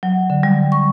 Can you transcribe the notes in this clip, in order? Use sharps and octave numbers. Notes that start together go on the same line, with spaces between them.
F#3
D3
G3
C#6